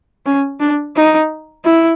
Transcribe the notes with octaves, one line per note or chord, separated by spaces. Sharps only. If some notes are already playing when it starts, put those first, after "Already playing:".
C#4
D4
D#4
E4